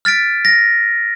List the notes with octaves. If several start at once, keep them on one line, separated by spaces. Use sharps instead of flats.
F6 A6 B6 D7
A#6